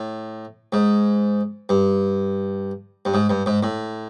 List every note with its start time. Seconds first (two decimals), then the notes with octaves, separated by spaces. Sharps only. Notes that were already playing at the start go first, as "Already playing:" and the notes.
Already playing: A2
0.73 G#2
1.69 G2
3.05 G2
3.14 G#2
3.30 G2
3.46 G#2
3.63 A2